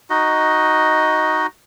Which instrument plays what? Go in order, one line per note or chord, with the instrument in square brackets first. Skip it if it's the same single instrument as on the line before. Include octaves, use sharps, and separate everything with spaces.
[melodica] D#4 F#4 D#5